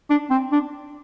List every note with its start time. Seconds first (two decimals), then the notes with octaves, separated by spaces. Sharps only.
0.10 D4
0.31 C4
0.52 D4